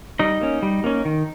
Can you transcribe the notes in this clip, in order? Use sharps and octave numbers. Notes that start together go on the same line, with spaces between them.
G3 D#4 D#5
A#3 C#4
G3
A#3 C#4
D#3